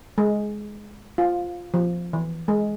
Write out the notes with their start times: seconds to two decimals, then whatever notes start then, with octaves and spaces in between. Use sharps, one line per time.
0.18 G#3
1.18 F4
1.74 F3
2.13 E3
2.48 G#3